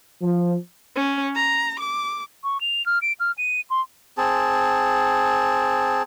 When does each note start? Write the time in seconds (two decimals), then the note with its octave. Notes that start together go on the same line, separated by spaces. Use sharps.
0.22 F3
0.96 C#4
1.35 A#5
1.79 D6
2.44 C#6
2.61 F7
2.86 F6
3.02 D7
3.20 F6
3.38 D#7
3.70 C6
4.18 C4 G#4 A5